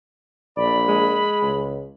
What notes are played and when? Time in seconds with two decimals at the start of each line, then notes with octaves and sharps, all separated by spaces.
0.57 A#1 D5 B5
0.88 G#3
1.43 C#2